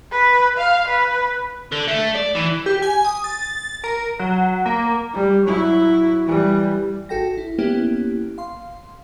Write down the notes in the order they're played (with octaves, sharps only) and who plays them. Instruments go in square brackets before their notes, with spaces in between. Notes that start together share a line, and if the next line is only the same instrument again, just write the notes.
[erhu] B4
F5
B4
[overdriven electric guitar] D3
A3
D5
E3
[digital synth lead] G4
G#5
D#6
A6
A#4
F#3
A#3
[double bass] G3
F#3 E4
E3 G3
[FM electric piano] G#1 F#4 A4 G5 A#6
E4
A#3 B3 C#4 E4 G4
F5 C6